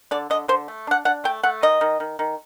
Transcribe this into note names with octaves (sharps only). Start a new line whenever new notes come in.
D3 D5
D3 D#5
D3 C5
A3
D4 F#5
D4 F#5
A3 G5
A3 F#5
D#3 D#5
D#3
D#3
D#3